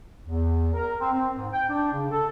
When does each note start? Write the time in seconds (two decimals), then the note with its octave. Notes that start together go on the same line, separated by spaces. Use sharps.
0.23 E2
0.74 A#4
0.99 C4
1.12 C4
1.35 G#2
1.52 G5
1.69 D4
1.91 C#3
2.11 A4